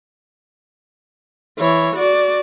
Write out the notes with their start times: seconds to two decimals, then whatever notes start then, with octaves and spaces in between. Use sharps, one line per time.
1.58 E3 C#5
1.96 F#4 D5